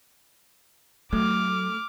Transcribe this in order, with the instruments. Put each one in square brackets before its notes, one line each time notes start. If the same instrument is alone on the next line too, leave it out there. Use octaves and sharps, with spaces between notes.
[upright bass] F#3 [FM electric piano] A3 [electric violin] D6 F6